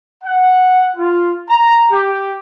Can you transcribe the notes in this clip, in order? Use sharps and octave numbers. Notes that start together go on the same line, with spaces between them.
F#5
F4
A#5
G4